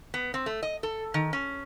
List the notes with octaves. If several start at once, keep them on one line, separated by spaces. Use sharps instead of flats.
B3
C4
A3
D#5
A4
D#3
C#4